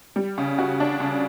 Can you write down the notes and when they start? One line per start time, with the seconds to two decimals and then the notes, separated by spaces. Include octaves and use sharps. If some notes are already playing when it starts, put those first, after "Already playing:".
0.16 G3
0.38 C#3
0.58 F#4
0.80 D4
1.00 C#3